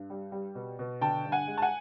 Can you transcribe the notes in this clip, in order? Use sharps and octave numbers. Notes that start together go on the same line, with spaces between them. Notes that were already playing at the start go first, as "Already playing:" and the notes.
Already playing: G2
G3
G3
B2
B2
D3 G5 A5
G2
F#5 G#5
G#3
A5
F#5 G#5